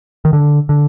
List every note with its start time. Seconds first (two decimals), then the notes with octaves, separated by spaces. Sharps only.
0.25 D#3
0.33 D3
0.69 D3